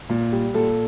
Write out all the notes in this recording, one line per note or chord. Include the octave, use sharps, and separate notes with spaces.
A#2
G3
A#2 A4